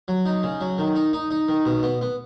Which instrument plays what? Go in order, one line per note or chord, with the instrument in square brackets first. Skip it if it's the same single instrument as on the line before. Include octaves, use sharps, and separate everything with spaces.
[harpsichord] F#3
D#4
C#3
F#3
D#3
D#4
D#4
D#4
D#3
B2
B3
B3